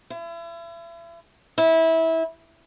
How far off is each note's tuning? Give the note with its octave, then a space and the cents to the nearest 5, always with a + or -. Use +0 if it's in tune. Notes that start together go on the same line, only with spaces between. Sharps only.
E4 +40
E4 -20